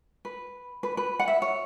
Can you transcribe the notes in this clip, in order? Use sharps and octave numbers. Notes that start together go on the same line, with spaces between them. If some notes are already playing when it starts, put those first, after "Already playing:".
B4
B4
B4
F#5
E5
C#5